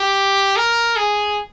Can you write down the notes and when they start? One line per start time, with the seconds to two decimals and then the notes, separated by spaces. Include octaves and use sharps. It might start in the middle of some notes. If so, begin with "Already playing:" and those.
Already playing: G4
0.56 A#4
0.96 G#4